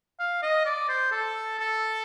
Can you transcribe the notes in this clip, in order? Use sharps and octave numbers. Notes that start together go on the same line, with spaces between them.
F5
D#5
D5
C5
A4
A4